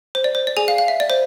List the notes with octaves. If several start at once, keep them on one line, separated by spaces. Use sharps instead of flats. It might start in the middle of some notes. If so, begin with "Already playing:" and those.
C5
D5
C5
D5
G#4 G#5
F5
F5
E5
D5
C5